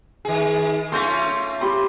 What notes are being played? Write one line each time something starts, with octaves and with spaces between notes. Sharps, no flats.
D#3 G#4
A3 C#4 F4 C6 G6 A#6
G4 B5 C6